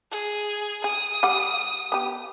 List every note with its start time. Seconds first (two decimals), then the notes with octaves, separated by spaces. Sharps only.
0.11 G#4
0.84 G#4 D#6
1.23 G3 F#5
1.92 B3 G4